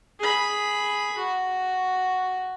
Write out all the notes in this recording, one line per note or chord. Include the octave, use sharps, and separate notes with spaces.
G#4 B5
F#4